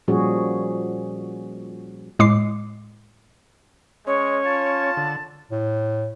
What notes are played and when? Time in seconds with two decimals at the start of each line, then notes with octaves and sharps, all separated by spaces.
0.08 A#2 F3 G3 C#4 F#4 G#4
2.19 A2 G#3 D6 C7
4.07 G#3 C#4 C#5
4.46 F4 A5
4.97 D3
5.51 A2